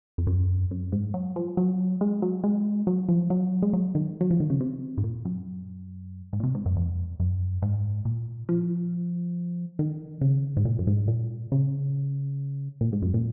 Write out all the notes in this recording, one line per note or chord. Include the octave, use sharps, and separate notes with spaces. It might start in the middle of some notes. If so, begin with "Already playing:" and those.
F2
F#2
F#2
G#2
F#3
F3
F#3
G#3
F#3
G#3
F#3
F3
F#3
G#3
F#3
D#3
F#3
F3
D#3
C#3
C3
G#2
A#2
F#2
G#2
A#2
C3
G#2
F#2
F2
F#2
G#2
A#2
F3
D#3
C#3
G#2
A#2
F#2
G#2
A#2
C#3
A#2
G#2
F#2
A#2